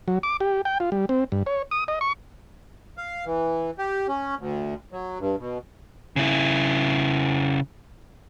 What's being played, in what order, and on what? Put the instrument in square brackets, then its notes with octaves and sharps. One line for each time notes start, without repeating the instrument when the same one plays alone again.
[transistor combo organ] F#3
D6
G4
G5
F4
G3
C4
G2
C#5
D#6
D#5
C#6
[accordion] F5
E3
G4
C#4
D2
F#3
G2
B2
[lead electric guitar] C#3 E4